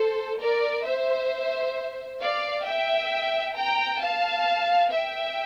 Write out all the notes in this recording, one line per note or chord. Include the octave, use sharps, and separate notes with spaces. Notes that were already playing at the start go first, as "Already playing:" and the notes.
Already playing: A4 C5
A#4 D5
C5 E5
D5 F5
E5 G5
G5 A#5
F5 A5
E5 G5